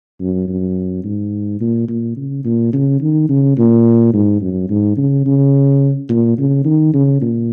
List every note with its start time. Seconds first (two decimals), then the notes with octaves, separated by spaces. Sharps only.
0.20 F#2
0.48 F#2
1.04 G#2
1.61 A#2
1.88 A#2
2.17 C#3
2.45 A#2
2.73 C#3
3.01 D#3
3.29 C#3
3.58 A#2
4.13 G#2
4.41 F#2
4.70 G#2
4.97 C#3
5.26 C#3
6.09 A#2
6.38 C#3
6.65 D#3
6.94 C#3
7.22 A#2